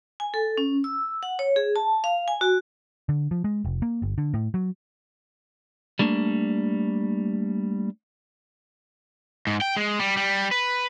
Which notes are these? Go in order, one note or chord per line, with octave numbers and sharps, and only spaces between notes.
G#5
A4
C#4
E6
F#5
C#5
G#4
A5
F5
G#5
F#4
D3
F3
G#3
F1
A#3
G1
D3
A2
F#3
G3 A3 A#3 D4
G#2
G5
G#3
G3
G3
B4